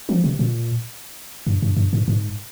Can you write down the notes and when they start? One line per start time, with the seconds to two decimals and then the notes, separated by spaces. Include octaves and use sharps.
0.09 F3
0.24 C3
0.39 A#2
1.47 G2
1.62 G2
1.77 G2
1.93 G#2
2.08 G#2